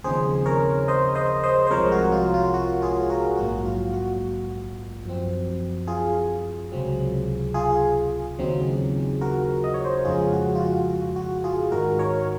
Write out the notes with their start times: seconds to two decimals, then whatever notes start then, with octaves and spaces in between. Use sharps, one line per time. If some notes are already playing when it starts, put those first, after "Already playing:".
0.04 D#2 C#3 F3 C4 D#4 G#4 C5
0.46 A#4 C#5
0.88 C5 D#5
1.15 C5 D#5
1.43 C5 D#5
1.67 C5
1.70 C2 C3 F3 G#3 A#4 C#5
1.92 F#4
2.12 F4
2.34 F4
2.54 F#4
2.82 F4 G#4
3.10 F#4 A#4
3.37 A#1 G#2 F#3 A#3 F#4
3.66 F4
3.93 F#4
5.05 F#2 F3 C4
5.87 F4 G#4
6.72 C#2 C3 F#3 C4
7.54 F4 G#4
8.38 D#2 C#3 F#3 C4 D#4
9.21 F#4 A#4
9.64 D#5
9.74 C#5
9.85 C5
9.95 A#4
10.05 F2 C#3 F3 G#3 C#4 F4 G#4
10.33 F#4
10.55 F4
10.60 F#4
10.89 F#4
11.16 F#4
11.44 F4 G#4
11.71 G#2 D#3 G#3 D#4 F#4 A#4
11.99 A#4 C#5